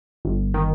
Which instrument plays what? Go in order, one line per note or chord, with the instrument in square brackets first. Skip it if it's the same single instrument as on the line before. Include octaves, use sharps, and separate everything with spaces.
[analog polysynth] G1
D#3